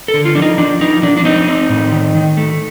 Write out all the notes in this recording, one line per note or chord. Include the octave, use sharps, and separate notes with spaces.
A4
D3
F4
F3 D4
D#4
F3 D4
F3 D#4
F3 D4
D4
C4 D#4
C4
A2
D#3
D#3
A3